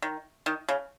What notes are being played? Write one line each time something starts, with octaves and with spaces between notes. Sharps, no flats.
D#3
D#3
C#3